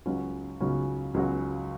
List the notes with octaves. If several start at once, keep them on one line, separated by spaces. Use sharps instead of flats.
C#2 C#3 F#3 C#4 F#4
C#2 C#3 F#3 C#4 F#4
C#2 C#3 F#3 C#4 F#4